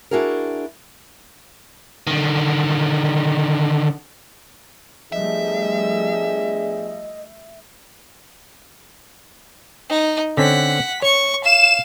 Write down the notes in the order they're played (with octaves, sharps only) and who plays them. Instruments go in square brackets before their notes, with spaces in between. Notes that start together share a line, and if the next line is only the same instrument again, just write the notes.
[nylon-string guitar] D4 E4 F#4 G#4 A#4
[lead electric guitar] D3 D#3
[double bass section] F3 G3 A3 [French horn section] B3 D4 G#4 [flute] D#5 [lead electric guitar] E5
[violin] D#4
[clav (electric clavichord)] D3 C4 C#4 [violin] F#5 B6
[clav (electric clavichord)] C#5 [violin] C#6
[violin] F5 [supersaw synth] E7